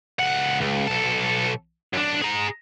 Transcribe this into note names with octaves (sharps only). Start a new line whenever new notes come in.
C#2 F#5
C#2
B1 A4
F#2 D4
G#4 A#5